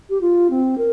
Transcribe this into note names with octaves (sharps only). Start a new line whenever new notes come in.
G4
F4
C4
A#4